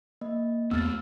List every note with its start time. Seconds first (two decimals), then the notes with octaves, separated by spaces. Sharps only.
0.21 A#3 D#5
0.71 E2 A3 B3 E6 F6 A6